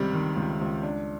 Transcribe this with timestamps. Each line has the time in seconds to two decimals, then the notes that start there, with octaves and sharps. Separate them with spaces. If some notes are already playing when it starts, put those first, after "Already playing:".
Already playing: C#2 C3 D#3 G3
0.13 D#3
0.37 C#2
0.61 C#2
0.83 D4